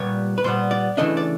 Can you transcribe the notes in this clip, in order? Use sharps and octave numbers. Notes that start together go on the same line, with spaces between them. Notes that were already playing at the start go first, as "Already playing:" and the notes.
Already playing: A#2 G3 B3 C#5
B4
A#2 G3 B3 C5
D5
C#3 E3 A3 D4 D#5
D5